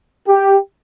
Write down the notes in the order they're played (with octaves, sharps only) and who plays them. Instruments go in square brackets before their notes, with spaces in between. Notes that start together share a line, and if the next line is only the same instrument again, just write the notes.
[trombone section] G4